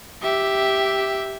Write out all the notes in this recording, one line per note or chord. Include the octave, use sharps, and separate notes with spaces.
G4 E5